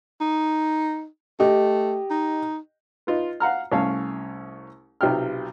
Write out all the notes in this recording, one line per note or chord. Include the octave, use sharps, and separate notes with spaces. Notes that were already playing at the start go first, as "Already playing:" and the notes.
D#4
A3 G4 D#5
D#4
D#4 F4 B4
F5 F#5 A#5 F6
C2 A3 C#4 F5 A5
B1 C3 F4 G5 F6